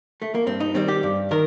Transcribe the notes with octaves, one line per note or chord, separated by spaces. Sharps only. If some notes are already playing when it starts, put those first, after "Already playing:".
A3
A#3
G2 C4
D#4
D#3 G3 C4
G4
G2
D#3 A#4